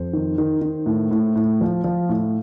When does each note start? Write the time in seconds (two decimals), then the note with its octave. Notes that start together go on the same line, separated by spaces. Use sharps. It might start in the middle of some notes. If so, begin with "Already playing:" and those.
Already playing: F2 C5
0.13 D#3
0.38 D#3
0.61 D#3
0.86 A2
1.11 A2
1.36 A2
1.61 F3
1.84 F3
2.09 A2